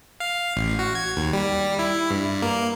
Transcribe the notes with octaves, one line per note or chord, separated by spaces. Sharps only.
F5
A1
F#4
G#6
D#2
G3
E4
G2
A#3